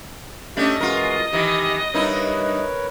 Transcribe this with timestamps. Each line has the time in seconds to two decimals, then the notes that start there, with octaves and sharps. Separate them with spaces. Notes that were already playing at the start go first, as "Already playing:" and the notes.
0.57 A3 C#4 D4 G4 D#5
0.80 E3 G#3 F4 F#4 A#4
1.33 D#3 E3 G4
1.94 G2 D#4 E4 A#4 B4 C#5